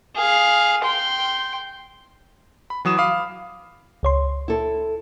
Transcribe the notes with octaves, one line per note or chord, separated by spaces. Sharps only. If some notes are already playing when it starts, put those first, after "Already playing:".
G#4 F5
G5 C6
B5
E3 F#3 D#6 E7
F5 B5 D6 D#6
C#2 C#5 C6
E4 A4